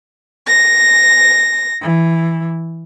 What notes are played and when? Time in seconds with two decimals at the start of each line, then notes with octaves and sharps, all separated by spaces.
0.46 A#6
1.81 E3